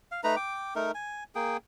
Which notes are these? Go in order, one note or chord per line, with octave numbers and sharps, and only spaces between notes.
F5
A3 D#4 B4 A#5
G5 D6
A3 D#4 A#4
G#5
A#3 G#4 G5